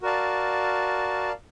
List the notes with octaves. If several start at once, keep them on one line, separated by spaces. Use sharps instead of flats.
F#4 A#4 D5 F5 A5